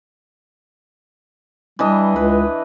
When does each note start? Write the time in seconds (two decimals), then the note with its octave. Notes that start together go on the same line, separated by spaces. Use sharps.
1.79 E3 G3 D4 D#5
2.16 C#2 B4